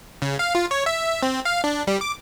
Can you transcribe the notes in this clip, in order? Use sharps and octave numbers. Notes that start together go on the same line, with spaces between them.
C#3
F5
F4
C#5
E5
C4
F5
D4
G3
D6